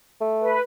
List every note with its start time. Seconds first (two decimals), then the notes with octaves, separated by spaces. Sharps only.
0.21 A3
0.40 B4